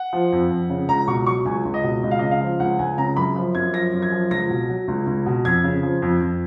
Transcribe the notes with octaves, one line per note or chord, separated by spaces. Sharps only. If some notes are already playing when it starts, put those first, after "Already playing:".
Already playing: F#5
F3
F2
F2
C#3
C#2 A#5
B2 C#6
F#3 C#6
C#2 G#5
C#2
D#5
B2
C#2 D#5
F5
C#3 D#5
F5
F3
C#2 F#5
C#2 G#5
C#3 A#5
F#2 B5
F3
F#2 G#6
F3 A#6
F#2
G#6
F3
C#2 A#6
B2
F#3
C#2
C#2
B2
F2 G#6
C#3
F3
F2
F2